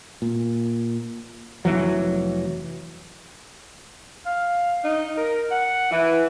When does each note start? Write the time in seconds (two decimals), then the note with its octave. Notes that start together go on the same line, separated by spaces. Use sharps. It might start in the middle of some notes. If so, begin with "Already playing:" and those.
0.22 A#2
1.65 F1 D#2 E3 F#3
4.26 F5
4.84 D#4
5.16 A#4
5.50 F#5
5.91 E3